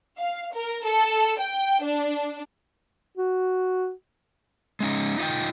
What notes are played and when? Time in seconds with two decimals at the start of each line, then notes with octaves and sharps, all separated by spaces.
0.18 F5
0.54 A#4
0.84 A4
1.39 G5
1.83 D4
3.17 F#4
4.80 G#3 C#4 D#4
5.19 D#4 F4 D#5 F#5 G5